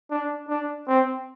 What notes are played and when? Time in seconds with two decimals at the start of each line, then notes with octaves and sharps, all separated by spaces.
0.11 D4
0.49 D4
0.88 C4